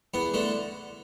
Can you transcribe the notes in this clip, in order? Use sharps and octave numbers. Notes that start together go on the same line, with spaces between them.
E2 B3
D3 A3